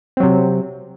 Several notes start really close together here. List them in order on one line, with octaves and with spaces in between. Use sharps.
C4 F#3 C3